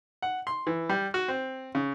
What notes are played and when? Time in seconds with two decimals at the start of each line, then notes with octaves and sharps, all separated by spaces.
0.22 F#5
0.47 C6
0.67 E3
0.89 G3
1.14 F#4
1.28 C4
1.75 C#3